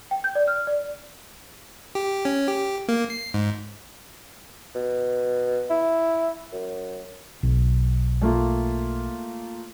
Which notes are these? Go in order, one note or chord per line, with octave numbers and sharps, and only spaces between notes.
G5
G6
D5
F6
D5
G4
C#4
G4
A#3
C7
G#2
B2
E4
F#2
B1
A3 A#3 F4